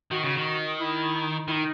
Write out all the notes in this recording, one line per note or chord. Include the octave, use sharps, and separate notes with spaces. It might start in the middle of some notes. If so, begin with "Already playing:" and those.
D#3 F#4
C#3
D#3
E4
D#3 D#4 E4